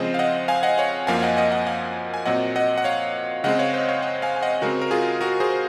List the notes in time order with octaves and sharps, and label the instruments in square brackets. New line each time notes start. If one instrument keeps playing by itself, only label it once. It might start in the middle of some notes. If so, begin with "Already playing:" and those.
Already playing: [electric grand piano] C#3 F3 G#3 C4 C5 D#5
F5
D#5 F#5
F5 G#5
D#5 F#5
C#5 F5
F#2 F3 A#3 F5 G#5
F5
D#5 F#5
D#5 F#5
D#5 F#5
F5 G#5
G#5
A#2 F#3 C4 D#5 F#5
D#5 F#5
F#5
C#5 F5
C#3 G#3 C4 D#5 F#5
C#5 F5
C5 D#5
C#5 F5
D#5 F#5
F5 G#5
G#5
D#5 F#5
C#3 G#3 C4 F#4 A#4
A#4
F4 G#4
F#4 A#4
G#4 C5